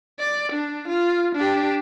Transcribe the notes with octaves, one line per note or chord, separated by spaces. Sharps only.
D5
D4
F4
D4 G4